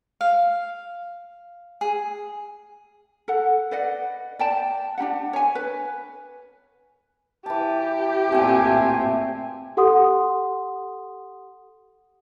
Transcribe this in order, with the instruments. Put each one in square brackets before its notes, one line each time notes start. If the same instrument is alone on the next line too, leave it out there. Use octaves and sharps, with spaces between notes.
[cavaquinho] F5
G#4
[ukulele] A4 F#5
B4 D5 D#5 F#5
D5 G5 A5
D4 D#4 G4 F#5
C#5 G#5
B4
[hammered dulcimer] E3 A5 [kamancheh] G4
[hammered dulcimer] A#2 A3 [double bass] C4 [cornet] G#5
[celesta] G4 A4 F#5 C6 D#6